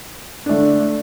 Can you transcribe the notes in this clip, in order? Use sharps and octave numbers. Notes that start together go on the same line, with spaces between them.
D3 A3 D4